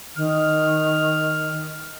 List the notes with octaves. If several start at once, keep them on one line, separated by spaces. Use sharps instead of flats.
D#3 F6